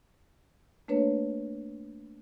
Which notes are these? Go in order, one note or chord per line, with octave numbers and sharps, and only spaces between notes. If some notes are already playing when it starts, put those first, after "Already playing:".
A3 A#3 D4 B4 C#5